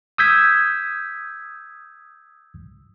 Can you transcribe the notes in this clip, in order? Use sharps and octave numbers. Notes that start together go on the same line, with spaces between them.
D#6 E6 G6 G#6 B6